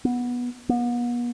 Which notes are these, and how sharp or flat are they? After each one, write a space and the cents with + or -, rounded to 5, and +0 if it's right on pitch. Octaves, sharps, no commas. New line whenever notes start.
B3 -15
B3 -40